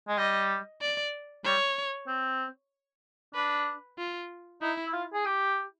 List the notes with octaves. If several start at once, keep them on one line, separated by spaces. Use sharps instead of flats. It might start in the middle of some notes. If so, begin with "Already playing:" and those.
G#3
G3 D#5
D5
G3 C#5
C4
D4 B4
F4
D#4 E4
E4
F4
G#4
G4